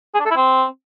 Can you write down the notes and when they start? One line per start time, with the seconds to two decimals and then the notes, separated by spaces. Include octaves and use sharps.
0.14 G#4
0.20 D4
0.25 A4
0.31 E4
0.36 C4